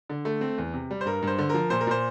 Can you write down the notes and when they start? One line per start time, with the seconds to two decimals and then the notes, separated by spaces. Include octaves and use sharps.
0.10 D3
0.25 A3
0.41 C4
0.58 E2
0.73 C3
0.91 G3
1.01 C5
1.05 G2 A#4
1.22 G2 C5
1.38 D3
1.49 F3 A#4
1.70 A#2 C5
1.81 A#4
1.87 A#2 C5